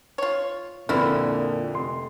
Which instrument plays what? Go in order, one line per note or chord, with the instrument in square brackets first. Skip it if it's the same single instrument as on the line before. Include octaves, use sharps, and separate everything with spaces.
[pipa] F4 C#5
[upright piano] F2 D3 [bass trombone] A#2 [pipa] E3 A#3 E4
[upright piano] F1 C6